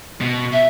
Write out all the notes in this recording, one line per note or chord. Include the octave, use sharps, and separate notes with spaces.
B2
E5